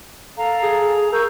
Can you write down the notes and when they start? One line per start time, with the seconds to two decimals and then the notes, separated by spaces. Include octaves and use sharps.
0.37 A4 F5 A#5
0.63 G#4
1.12 A#4 C#6 E6 G6